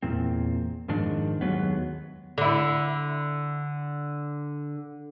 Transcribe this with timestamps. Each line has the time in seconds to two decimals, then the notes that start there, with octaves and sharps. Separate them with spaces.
0.02 E2 A#2 C4
0.88 F2 G#2 D#3 D4
1.41 D#2 F#3 G#3 B3
2.38 D3 E4